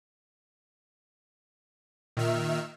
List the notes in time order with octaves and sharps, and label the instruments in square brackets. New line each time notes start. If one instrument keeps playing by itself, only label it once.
[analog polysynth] A#2 [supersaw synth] D#3 E5 F6